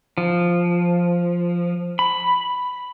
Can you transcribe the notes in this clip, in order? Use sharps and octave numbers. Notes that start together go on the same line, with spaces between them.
F3
B5